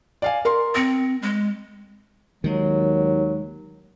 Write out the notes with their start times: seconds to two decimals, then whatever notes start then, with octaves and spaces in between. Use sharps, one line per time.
0.22 D5 F5 G#5
0.45 A#4 C6
0.75 C4 A#6 C#7
1.22 G#3
2.44 D#2 D#3 F#3 G#3